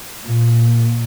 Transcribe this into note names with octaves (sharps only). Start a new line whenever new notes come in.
A#2